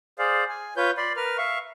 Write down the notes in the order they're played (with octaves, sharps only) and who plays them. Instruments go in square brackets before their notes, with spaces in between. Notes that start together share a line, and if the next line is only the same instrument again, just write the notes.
[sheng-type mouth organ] G#4 C5 D5 F5
G#5
F4 B4 C#5 G6
D5 B5 C6
A#4 B4 F6
E5 F5 C#6